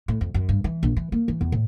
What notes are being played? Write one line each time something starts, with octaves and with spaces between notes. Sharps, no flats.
A2
F2
F#2
G2
E3
A#1
E3
A#3
E3
E2
A2